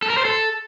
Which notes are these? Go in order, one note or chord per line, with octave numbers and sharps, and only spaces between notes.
A4
A#4
C5
A4